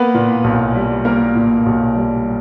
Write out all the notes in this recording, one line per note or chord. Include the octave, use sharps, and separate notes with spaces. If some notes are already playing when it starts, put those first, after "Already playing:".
Already playing: A#3 B3 B4
A#2
B1
G3
A#3 A#4
A#2
B1
G3